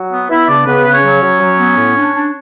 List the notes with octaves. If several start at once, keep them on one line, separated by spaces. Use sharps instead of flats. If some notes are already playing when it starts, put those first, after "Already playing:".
Already playing: F#3
B3
B3 E4 E5
C#3 D4 D5
C#3 B3 B4
C#3
C#4 C#5
F#3
F#3
F#3
B3
A2
D4
D4